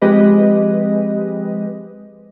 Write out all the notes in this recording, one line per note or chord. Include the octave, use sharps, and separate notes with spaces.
F3 G#3 C4 G4 B4 D#5